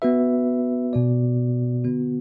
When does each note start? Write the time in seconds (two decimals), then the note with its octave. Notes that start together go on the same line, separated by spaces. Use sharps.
0.02 B3 F#4 B4 E5
0.93 B2 B3 F#4 D5
1.84 D3 B3 F#4